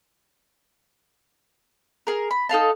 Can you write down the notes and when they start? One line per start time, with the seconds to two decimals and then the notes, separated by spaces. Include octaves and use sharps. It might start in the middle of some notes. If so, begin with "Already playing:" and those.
2.07 G#4 A#4
2.31 B5
2.49 D#4 A4 F5 A5